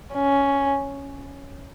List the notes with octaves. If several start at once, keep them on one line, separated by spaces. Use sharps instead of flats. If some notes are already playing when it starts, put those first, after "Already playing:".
C#4